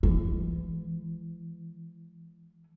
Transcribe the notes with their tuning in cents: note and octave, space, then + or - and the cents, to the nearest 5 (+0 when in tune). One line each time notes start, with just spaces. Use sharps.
E3 +40 G#3 +20